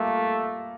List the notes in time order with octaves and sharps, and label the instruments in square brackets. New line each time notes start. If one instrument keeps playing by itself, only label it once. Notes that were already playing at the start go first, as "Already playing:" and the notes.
Already playing: [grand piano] G3 A#3 F4 [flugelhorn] A3